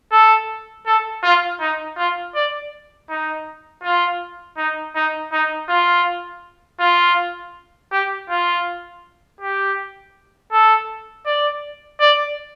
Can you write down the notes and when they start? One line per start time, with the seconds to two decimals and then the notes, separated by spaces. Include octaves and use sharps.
0.12 A4
0.86 A4
1.23 F4
1.60 D#4
1.97 F4
2.35 D5
3.09 D#4
3.83 F4
4.57 D#4
4.95 D#4
5.32 D#4
5.69 F4
6.80 F4
7.92 G4
8.29 F4
9.40 G4
10.52 A4
11.26 D5
12.01 D5